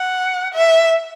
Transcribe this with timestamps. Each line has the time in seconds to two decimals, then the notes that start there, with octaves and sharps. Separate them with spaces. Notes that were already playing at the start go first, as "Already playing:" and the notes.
Already playing: F#5
0.54 E5